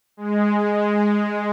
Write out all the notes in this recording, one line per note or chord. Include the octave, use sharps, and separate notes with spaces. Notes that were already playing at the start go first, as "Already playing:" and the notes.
G#3